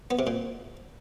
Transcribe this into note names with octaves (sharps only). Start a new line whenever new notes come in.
B3
C3
A#2